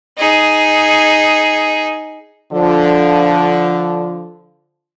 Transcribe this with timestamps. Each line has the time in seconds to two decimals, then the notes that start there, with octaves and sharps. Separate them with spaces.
0.18 D#4 G#4
2.52 D3 F3